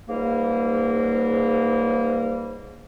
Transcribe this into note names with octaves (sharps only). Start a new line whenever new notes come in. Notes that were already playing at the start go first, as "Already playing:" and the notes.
C#2 G#2 G3 A#3